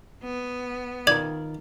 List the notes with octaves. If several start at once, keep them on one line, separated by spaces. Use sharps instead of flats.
B3
D#3 F4 A#4 D5 G#6